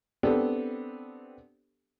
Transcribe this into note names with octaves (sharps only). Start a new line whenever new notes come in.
B3 C4 D4 G4 A4